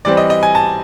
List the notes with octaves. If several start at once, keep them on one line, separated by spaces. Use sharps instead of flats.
E3 G3 C4 D5
D#5
D#5
G#5
A5